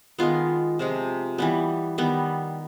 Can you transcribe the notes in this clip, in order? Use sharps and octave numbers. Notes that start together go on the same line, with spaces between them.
D#3 G#3 B3 F4
C3 F3 G#3
E3 G3 B3
D#3 G3 B3